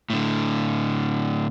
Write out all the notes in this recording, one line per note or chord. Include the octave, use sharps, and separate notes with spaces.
A2 D3